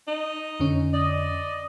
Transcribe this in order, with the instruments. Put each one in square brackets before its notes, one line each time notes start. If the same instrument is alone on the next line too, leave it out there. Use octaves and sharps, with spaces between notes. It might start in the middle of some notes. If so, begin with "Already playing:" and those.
[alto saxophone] D#4
[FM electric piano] F2 D3 C#4
[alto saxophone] D5 [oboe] D#5